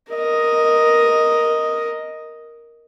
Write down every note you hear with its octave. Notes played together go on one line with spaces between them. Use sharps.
A#4 D#5